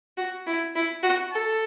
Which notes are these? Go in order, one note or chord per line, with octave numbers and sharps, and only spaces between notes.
F#4
E4
E4
F#4
A4